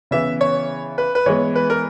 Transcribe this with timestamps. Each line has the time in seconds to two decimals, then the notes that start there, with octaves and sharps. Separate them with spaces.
0.11 C#3 E3 B3 E5
0.41 C#5
0.98 B4
1.15 B4
1.26 E3 G#3 B3 C#5
1.55 B4
1.70 A#4